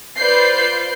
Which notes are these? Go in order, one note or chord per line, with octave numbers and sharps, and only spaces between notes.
F4 B4 C5 D5 G6 C7